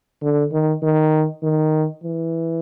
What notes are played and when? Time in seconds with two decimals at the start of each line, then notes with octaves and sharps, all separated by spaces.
0.23 D3
0.52 D#3
0.83 D#3
1.43 D#3
2.03 E3